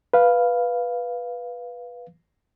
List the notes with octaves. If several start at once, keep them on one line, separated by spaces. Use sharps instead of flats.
B4 F5